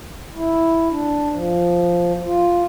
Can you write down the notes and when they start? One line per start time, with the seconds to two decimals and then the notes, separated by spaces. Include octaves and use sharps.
0.35 E4
0.91 D4
1.32 F3
2.24 F4